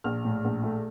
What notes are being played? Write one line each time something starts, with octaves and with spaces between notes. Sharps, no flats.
A#1 F6
A2
A#1
A3